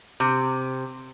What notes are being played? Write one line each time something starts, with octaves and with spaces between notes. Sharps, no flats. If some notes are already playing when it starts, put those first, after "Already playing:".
C3